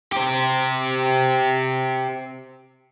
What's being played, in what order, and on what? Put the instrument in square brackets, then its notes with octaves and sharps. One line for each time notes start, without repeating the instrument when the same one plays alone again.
[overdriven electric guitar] G4 C5